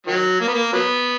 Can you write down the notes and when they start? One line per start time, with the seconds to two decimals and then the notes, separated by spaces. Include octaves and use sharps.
0.07 D#3 F#3
0.40 A#3
0.47 B3
0.54 A#3
0.73 F#3 B3